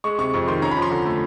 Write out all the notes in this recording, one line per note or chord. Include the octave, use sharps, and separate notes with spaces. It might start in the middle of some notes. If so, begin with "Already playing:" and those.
G#3 C#6
C3 C#6
F2 C#6
D#3 C6
C#4 A#5
B5
F3
C6
D3
A3